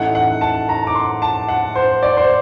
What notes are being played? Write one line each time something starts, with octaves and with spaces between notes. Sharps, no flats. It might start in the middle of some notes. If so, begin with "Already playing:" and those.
Already playing: A1 A2 A3 D#4 F#5
F#5
A5
A#5
D6
C6
A5
F#5
C5
D5
C5